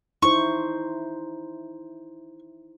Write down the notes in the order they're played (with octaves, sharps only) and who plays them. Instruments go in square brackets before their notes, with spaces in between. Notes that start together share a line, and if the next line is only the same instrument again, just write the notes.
[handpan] D#4 E4 C5 [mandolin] C#6